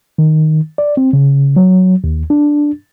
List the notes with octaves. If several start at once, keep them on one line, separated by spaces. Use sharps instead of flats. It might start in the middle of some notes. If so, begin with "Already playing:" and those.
D#3
D5
C4
C#3
F#3
D#2
D4